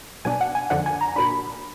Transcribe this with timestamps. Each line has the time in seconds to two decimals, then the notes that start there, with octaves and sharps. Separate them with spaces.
0.25 B2 F#3 B3 D4 G#5
0.41 F#5
0.55 G#5
0.70 F2 D3 F3 A#3 D4 F#5
0.86 G#5
1.01 A#5
1.16 A#2 F#3 A#3 D4 B5